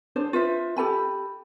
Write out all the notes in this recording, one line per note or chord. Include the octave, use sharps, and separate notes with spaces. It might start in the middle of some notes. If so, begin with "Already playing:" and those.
D4 G#4 C5 C#5
F4 B4 C5 E5
G4 A4 G#5 B5